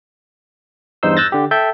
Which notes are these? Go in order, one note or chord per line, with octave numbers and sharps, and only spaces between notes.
E2 G2 D#4 C5 C6 E6
E6 F#6 G6 A6 A#6
D3 G4
A4 E5 G5 A5 G6